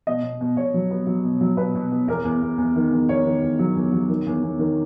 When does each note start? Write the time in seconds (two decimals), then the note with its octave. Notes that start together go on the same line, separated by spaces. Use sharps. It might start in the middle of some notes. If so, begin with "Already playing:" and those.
0.07 B2 D#5
0.23 B2
0.41 B2
0.57 B2 C#5
0.74 F#3
0.91 B3
1.07 F#3
1.24 B2
1.41 F#3
1.57 B2 B4
1.75 B2
1.92 B3
2.08 E2 A#4
2.24 E2
2.42 E2
2.58 E2
2.76 D#3
2.92 E2
3.09 E2 C#5
3.25 D#3
3.43 E2
3.59 F#3
3.75 E2
3.92 F#3
4.09 D#3
4.26 E2
4.43 E2
4.59 D#3